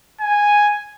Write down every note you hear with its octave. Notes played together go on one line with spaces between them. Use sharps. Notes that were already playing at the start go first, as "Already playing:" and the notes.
G#5